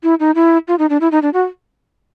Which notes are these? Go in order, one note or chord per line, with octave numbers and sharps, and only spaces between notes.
E4
D#4
E4
F4
D#4
D4
E4
D#4
D4
F#4